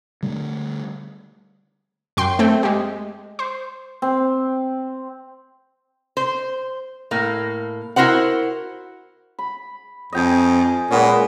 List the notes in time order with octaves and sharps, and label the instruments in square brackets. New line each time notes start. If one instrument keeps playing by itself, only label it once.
[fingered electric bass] D3 G3 A3
[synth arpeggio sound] F#2 G5 C6
A3 C4 G5
G#3 G4
C5
[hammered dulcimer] C4
[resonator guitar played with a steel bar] C5
A2 A#3
E4 F#4 A#4 C5 F#5
[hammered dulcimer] B5
[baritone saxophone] F2 [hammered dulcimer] D#5 G5 G#5
[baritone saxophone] A#2 [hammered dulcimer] G#3 B3 C#4